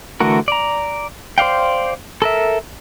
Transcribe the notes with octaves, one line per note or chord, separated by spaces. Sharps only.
D3 E3 A3 F#4 A#4
D5 A#5
C5 D5 F5 G5
A4 A#4 E5